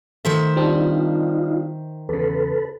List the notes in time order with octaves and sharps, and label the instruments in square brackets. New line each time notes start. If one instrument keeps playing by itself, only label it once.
[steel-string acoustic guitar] D#3 C5 E5 [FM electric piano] A3
[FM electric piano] G3 C4 D4 [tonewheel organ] D#4 F4
[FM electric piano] E2 C#3 [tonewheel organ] A4 B4